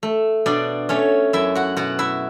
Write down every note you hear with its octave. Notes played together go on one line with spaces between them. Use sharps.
A3
B2 D4 D5
A3 C#4 C#5
F#2 E4 E5
F#4 F#5
B2 F#4 F#5
E4 E5